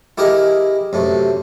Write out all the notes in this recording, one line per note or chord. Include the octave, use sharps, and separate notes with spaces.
E4 G4 G#4 A#4 D#5
F#2 C3 A3